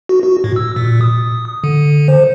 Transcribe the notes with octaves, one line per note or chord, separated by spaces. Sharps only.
F#4
F#4
A2
E6
A#2
D#6
D3
C5